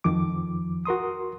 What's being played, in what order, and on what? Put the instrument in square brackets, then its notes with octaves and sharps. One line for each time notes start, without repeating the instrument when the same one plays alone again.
[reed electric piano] F2 D#3 F3 D6
F#4 A#4 C6 D#6